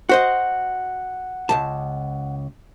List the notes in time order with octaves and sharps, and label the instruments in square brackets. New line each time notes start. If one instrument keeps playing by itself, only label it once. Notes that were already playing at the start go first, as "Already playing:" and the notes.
[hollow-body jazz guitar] F#4 C5 D#5 [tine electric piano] F#5
[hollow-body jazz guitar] C#2 C#3 A5